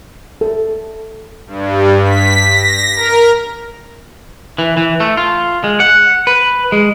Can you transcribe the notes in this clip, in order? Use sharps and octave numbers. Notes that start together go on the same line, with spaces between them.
A4
G2
B6
A#6
A#4
E3
E3
A3
F4
G#3
F#5
B4
G#3